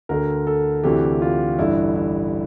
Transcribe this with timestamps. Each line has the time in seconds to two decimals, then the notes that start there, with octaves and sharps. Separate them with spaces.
0.09 D2 D3 A#4
0.47 A4
0.84 D2 C3 E3 G4
1.22 F4
1.59 A1 G2 D3 E4
1.95 E4